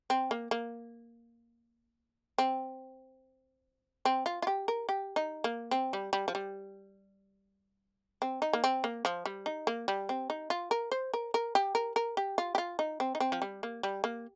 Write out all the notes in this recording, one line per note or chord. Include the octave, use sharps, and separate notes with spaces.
C4
A#3
A#3
C4
C4
F4
F4
G4
A#4
G4
D#4
A#3
C4
G3
G3
F3
G3
C4
D#4
A#3
C4
A#3
F3
G3
D#4
A#3
G3
C4
D#4
F4
A#4
C5
A#4
A#4
G4
A#4
A#4
G4
F4
G4
F4
D#4
C4
D#4
C4
F3
G3
A#3
G3
A#3